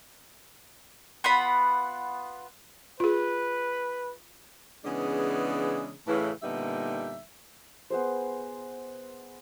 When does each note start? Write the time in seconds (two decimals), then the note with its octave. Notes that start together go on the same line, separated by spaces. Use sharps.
1.24 B3 F4 F#5 B5
3.00 F4 G#4 B4
4.84 C#3 E3 G#3 B3 D4 G#4
6.07 A2 C#3 E3
6.43 A#2 D3 G3 B3 D#4 E5
7.90 B3 G#4 C5